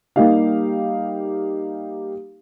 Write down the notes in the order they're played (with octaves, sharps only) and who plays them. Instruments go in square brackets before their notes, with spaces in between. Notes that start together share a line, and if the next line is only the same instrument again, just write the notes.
[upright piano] G3 A#3 D#4 G4 F5